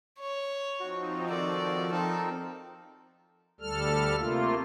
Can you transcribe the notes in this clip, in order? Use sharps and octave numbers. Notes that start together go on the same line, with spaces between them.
C#5
F3 C4 D#4 F#4
D#3 F3 F#4 A4 D5
C4 D#4 A4 A#4
D2 G3 A4 F6
C3 A3 A#3 F4